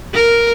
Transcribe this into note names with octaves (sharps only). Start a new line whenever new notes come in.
A#4